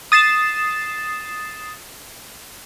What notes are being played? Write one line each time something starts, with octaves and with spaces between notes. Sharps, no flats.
D#6 A6 C7 E7